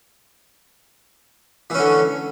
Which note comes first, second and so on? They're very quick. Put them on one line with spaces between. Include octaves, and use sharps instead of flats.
E3 C#4 D3